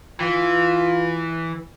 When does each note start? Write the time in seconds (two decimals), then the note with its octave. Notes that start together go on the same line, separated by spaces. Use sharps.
0.20 E3 F4